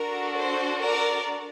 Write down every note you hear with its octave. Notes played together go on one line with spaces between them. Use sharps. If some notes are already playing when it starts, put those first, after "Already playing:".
Already playing: D4 F#4 A4 A#4
C5
A#4 D5